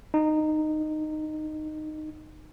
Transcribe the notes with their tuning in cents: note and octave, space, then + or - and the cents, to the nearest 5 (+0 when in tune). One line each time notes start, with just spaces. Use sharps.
D#4 -15